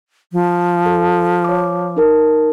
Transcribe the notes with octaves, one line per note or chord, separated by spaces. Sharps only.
F3
A4
C#5 D6
D#4 A#4 A5